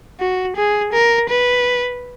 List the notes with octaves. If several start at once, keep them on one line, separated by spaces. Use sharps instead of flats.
F#4
G#4
A#4
B4